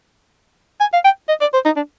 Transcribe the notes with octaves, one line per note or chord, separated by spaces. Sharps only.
G#5
F5
G5
D#5
D5
C5
D#4
D4